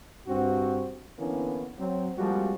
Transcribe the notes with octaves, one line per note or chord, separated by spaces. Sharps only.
G2 C4 F#4
D3 E3 A#3 B3 C#4 E4
F#3 C4
F3 G3 G#3 A#3 C4 F#4